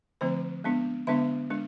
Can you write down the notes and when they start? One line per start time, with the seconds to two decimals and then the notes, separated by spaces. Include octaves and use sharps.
0.21 D3 F3 A3 C4 C5
0.64 G#3 B3 D4
1.07 D3 G#3 B3 D4 E5
1.50 G#3 D4